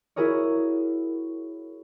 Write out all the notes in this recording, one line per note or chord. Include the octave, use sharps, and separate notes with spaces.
E4 F#4 G#4 A#4 C#5